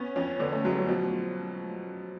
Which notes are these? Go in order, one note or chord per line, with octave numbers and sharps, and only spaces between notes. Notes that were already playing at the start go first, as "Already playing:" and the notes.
Already playing: B3 C#4
F2 C#4
D3 B3
A3
F#3 G#3
G3
B2 F3
F3